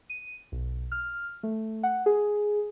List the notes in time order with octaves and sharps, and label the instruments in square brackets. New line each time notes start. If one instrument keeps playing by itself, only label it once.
[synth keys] D#7
B1
F6
A3
F#5
G#4